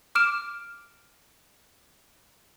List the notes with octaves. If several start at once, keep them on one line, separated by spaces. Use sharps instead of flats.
D6 F6 D7 E7